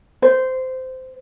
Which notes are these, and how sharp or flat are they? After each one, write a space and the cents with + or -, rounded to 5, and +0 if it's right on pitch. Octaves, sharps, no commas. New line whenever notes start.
C5 -15